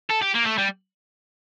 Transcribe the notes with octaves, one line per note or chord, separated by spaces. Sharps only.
A4
G4
A#3
A3
G3